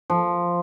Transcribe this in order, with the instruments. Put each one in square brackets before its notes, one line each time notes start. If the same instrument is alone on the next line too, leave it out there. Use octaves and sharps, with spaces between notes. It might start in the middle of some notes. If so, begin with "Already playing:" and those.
[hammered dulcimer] F3